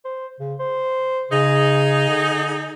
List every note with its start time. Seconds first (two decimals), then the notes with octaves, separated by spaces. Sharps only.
0.05 C5
0.40 C#3
0.59 C5
1.31 C#3 D#4 G#4
2.09 D3